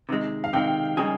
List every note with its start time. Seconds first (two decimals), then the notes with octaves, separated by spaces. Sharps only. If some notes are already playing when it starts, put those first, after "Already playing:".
0.09 C3 D#3 G#3
0.44 F5
0.53 C3 D#3 G#3 G5
0.97 C#3 G3 A#3 D#4 G#4